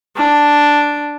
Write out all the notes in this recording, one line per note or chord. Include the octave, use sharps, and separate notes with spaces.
D4